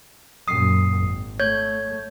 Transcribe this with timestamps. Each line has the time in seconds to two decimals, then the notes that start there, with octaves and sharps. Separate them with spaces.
0.48 F#2 A#2 D#6 C7
0.98 G#1
1.40 A3 C#5 G6 G#6